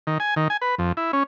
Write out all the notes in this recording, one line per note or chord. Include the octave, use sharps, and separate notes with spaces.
D#3
G#5
D#3
G#5
B4
F2
E4
C#4